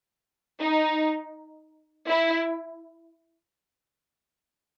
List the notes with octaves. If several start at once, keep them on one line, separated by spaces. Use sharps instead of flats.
D#4
E4